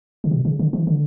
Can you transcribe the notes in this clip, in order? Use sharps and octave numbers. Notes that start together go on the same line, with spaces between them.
C#3
B2
C#3
D3
E3
D3